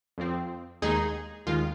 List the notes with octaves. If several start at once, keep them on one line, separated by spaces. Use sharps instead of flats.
F2 F3 C4
D#2 D#3 G#3 D#4 G#4
D#2 D#3 G#3 F4